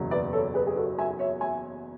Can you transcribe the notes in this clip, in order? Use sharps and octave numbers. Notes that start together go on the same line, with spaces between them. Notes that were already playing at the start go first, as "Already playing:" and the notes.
Already playing: F#1 E2 B2 F#3
B4 D5
A4 C#5
G#4 B4
G#4
F#4 A4
E5 G#5
C#5 E5
E5 G#5